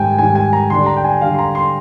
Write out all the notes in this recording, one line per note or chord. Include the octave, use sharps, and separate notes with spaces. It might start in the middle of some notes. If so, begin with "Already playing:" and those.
Already playing: G#2 D#3 G3 G5 G#5
G#2 D#3 G3 G#5
G#5
A#5
D3 G3 D4 C6
A#5
G5
G#5
D3 G3 D4 F5
C6
A#5
C6